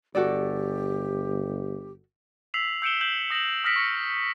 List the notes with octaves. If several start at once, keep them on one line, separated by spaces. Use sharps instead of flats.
G1 F#4 G4 A4 D5
E6 B6 C7 F7 F#7
E6 G6 C#7 D7 E7 G7
G6 E7 F#7
D#6 A#6 C#7 E7 F#7
D#6 F6 A#6 B6 C#7 D7
C#6 A#6 C#7